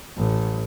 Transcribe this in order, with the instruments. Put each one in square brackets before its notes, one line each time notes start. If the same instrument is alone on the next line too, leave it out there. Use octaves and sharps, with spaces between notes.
[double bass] A1